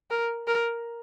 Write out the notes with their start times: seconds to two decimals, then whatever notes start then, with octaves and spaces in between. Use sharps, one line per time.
0.10 A#4
0.47 A#4